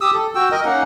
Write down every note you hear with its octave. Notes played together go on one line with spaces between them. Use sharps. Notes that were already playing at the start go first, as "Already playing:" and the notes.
G4 D#6 E6
A4
F#4 G5 E6
A#4 D#5
A#3 C#4 D#4 F#5